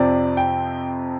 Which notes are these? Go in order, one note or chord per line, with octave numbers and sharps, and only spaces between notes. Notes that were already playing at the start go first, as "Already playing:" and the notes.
Already playing: F2 C3 F3 C4 D5
G5